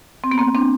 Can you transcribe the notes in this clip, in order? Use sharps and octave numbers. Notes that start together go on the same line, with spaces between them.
C4
B3
A#3 C4
C4 D4